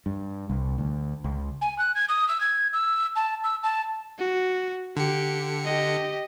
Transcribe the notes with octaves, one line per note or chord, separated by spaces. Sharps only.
G2
C2
D2
C#2
G#5
F#6
G#6
D#6
E6
G#6
E6
A5
E6
A5
F#4
D3 G4 C#7
G4 D#5